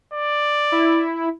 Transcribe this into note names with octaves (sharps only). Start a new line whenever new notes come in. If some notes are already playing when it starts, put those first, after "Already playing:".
D5
E4